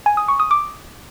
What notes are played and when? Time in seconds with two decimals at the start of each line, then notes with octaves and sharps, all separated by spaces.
0.06 G#5
0.17 D#6
0.28 C#6
0.40 D#6
0.51 D6